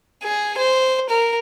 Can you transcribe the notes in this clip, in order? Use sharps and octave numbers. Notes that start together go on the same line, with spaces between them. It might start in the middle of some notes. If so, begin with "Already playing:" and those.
G#4
C5
A#4